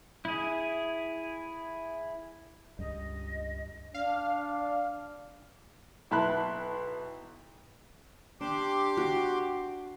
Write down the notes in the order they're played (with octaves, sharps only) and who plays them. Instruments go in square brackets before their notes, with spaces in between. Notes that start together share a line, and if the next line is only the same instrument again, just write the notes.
[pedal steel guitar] E4 G#4
[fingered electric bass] C#2 G2 G3 [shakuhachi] D#5
[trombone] D4 [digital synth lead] F5
[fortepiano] B1 E4 A5 B5 C6 F#6
[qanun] D4 [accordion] G4 C6 D6
[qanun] F#4